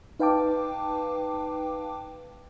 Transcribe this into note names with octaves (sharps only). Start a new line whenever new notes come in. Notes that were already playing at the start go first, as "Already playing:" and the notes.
D#4 B4 F5 G5 A5 D6